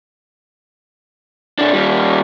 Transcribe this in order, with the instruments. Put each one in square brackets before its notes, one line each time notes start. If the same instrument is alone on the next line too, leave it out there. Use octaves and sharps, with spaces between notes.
[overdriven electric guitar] C3 D4
D#2 G3